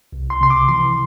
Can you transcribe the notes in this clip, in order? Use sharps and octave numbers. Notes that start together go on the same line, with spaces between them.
C2
C6
C3 C6
D6
E3 C6